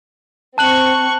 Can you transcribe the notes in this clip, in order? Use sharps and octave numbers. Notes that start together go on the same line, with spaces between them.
C4 A5 C#6 F#6 F#7